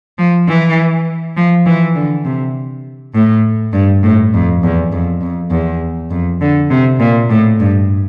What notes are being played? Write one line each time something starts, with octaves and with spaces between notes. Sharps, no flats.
F3
E3
F3
E3
D3
C3
A2
G2
A2
F2
E2
F2
F2
E2
F2
D3
C3
A#2
A2
G2